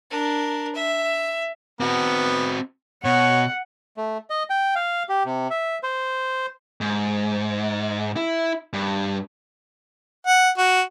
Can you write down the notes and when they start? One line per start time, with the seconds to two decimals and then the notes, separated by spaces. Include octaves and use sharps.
0.10 D4 A#4
0.75 E5
1.80 B3 C4 F#4
3.05 B2 C#5 F#5
3.97 A3
4.30 D#5
4.50 G5
4.76 F5
5.09 G4
5.25 C3
5.50 E5
5.83 C5
6.81 G#2
8.16 E4
8.73 G2
10.27 F#5
10.58 F#4